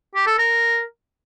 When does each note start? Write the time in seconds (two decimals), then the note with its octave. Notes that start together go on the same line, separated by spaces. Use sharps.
0.15 G4
0.27 A4
0.38 A#4